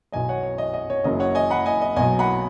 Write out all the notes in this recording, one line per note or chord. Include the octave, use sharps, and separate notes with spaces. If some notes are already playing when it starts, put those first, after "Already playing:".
B1 B2 F#3 D#5 G#5
C#5 F#5
C#5
D#5
D#5
C#5
F#1 F#2 C#3 F#3 D#5
C#5 F#5
D#5 G#5
F#5 B5
D#5 G#5
D#5
B1 B2 F#3 D#5 G#5
F#5 B5